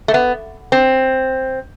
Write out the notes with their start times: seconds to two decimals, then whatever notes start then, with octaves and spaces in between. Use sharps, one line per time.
0.08 A3
0.14 B3
0.72 C4